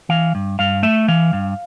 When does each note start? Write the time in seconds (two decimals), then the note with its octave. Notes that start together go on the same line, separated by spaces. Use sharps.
0.09 E3 F5
0.35 G2
0.59 G2 F5
0.83 A3 E5
1.08 E3 F5
1.33 G2